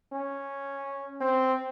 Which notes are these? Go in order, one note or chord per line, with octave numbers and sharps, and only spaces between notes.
C#4
C4